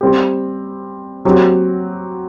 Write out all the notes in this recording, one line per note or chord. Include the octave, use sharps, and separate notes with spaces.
G3 C4 G4
F#3 C4 G4